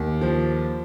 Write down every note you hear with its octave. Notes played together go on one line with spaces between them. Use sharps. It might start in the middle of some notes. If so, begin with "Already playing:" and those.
Already playing: D#2
F3